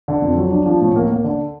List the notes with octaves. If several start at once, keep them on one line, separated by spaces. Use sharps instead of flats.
D3
F2
F#3
D4
F3
A2
A#3
A#3
D3